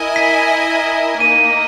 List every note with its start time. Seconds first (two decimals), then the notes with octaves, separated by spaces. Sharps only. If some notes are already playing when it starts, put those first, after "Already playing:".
Already playing: E4 A#4 D#5 G#5
0.16 B6
1.20 A#3 D#4 A#4 D#7